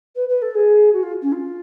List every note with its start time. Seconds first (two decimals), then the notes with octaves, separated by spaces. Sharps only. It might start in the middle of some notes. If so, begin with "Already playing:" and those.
0.15 B4
0.28 B4
0.41 A4
0.54 G#4
0.93 F#4
1.02 F4
1.22 C#4
1.32 F4